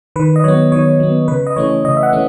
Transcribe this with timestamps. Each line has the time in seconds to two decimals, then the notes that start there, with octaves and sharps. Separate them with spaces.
0.16 D#3 B4
0.36 D#5
0.44 F#3 B3 C#5
0.72 D#3 C#5
1.00 F#3 B3
1.28 C#3 B4
1.47 D#5
1.56 E3 A3 C#4 C#5
1.84 C#3 D#5
1.97 E5
2.03 F#5
2.12 E3 A3 C#4